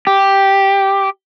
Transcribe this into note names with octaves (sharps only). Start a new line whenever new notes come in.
G4